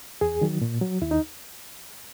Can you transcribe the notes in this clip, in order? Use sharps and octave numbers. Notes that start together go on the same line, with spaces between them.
E2 G#4
D#3 F#3
A#2
F#3
D#2 E4
D#4